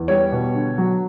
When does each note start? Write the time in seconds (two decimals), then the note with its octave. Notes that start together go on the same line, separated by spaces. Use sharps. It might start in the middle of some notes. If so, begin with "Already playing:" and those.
Already playing: E2
0.08 G3 C#5
0.32 B2
0.54 D3
0.78 F#3